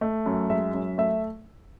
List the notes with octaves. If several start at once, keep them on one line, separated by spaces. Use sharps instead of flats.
A3
F#2
G#3 E5
F#2
A3 E5